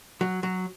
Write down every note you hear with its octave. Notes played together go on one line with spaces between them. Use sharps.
F#3
F#3